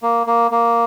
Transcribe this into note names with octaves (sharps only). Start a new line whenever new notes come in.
A#3
A#3
A#3